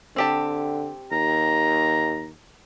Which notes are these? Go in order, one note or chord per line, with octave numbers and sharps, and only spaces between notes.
D3 C4 G4 A5
D#2 A#5